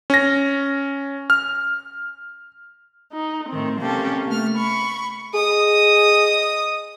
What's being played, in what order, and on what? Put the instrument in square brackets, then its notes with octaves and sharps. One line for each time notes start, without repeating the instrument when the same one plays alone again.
[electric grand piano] C#4 A#6
F6
[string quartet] D#4
A2 D#3 C4
C3 A#3 C#4 G4 A4
A3 F6
B5 C#6
[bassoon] G#4 [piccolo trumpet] D#5 [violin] D#6